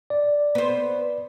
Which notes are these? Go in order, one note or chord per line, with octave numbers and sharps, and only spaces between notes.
D5
B3 C5